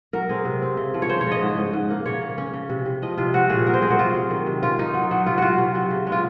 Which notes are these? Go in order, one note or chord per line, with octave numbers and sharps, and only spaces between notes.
F#3 A#4
C4 G#4
C3
C4
C#3
F3
C#5
C#3 C5
C#5
C#3
D#5
G#2
G#2
G#2
A#3
C#3 C#5
A#3
C#4
C#3
C3
C3
F3 D#5
C3 F4
C4 F#4
A#2 G#4
F#3 A#4
C5
C4 G#4
F#4
C3 F4
F#3
D#3
C3
C#4 F4
C#4 D#4
F#3
F#3
C3 F4
F#3 F4 F#4
C3
F#3
C#3
G#3
F4